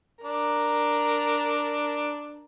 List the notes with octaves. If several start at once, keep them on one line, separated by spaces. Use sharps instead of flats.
D4 A#4